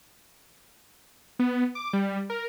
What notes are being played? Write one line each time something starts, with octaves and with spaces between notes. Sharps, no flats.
B3
D6
G3
A#4